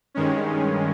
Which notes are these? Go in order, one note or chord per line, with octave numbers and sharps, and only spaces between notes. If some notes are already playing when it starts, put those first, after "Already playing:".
G2 D#3 G#3 C#4